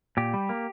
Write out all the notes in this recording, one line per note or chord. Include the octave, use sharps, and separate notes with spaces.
A#2 G4
G3
A#3